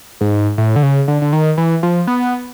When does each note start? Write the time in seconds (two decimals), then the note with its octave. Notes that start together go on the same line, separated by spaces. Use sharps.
0.21 G#2
0.58 A2
0.76 D3
0.83 C#3
1.08 D3
1.22 D3
1.33 D#3
1.57 E3
1.83 F3
2.07 B3